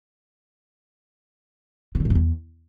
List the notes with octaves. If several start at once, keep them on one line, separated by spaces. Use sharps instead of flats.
C3
D3
A2
G2
E2